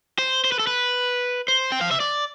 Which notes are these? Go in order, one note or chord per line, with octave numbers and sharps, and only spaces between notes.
C5
C5
B4
A4
B4
C5
G5
F5
E5
D5